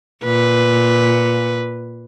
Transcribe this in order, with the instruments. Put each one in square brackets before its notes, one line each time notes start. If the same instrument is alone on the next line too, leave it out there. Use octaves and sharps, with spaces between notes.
[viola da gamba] A#2 B4